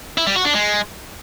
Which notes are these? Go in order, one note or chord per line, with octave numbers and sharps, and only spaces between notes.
E4
G3
F#4
D4
G#3